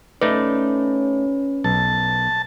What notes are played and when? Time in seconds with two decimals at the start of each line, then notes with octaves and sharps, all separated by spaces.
0.22 A3 C#4 D#4 B4 D5
1.64 B1 A5